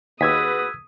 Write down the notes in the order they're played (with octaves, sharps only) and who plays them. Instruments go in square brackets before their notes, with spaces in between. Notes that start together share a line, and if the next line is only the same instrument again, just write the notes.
[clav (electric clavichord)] D#2 [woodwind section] F#4 G#4 B4 [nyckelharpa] D#6 [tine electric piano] E6 G#6 B6